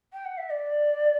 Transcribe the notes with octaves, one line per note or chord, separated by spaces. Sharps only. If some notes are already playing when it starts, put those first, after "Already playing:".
G5
F#5
E5
D5